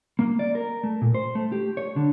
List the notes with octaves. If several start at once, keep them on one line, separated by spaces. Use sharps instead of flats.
A#3
D5
A#4
A3
A#2
C5
A3
G4
C#5
D3